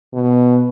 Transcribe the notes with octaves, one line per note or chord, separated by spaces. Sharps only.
B2